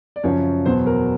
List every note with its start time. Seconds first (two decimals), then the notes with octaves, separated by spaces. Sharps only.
0.16 D5
0.23 F#2 C#3 F3 C#5
0.65 E2 B2 F#3 C5
0.86 A#4